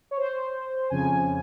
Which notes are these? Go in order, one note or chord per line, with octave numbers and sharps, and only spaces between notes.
C#5
C5
F2 C#3 F3 G#5